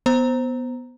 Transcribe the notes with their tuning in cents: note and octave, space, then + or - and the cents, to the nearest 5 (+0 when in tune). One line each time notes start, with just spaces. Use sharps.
B3 +0 C5 +0 A#5 +0